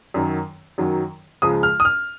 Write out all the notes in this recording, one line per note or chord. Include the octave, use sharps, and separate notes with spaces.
F#2 D#3 F#3
F#2 D#3 F#3
C#2 C#3 F3 G#3 D#6
F6
D#6
F6